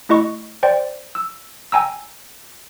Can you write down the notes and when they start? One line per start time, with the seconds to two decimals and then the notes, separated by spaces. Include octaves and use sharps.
0.09 A3 E4 D#5 C#6
0.63 C5 D5 G5
1.15 E6
1.72 G5 G#5 A#5 E6